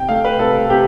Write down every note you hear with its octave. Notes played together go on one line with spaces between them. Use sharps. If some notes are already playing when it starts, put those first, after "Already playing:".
Already playing: C3 G5
A3 F5
B4
C3 A4
C3 G4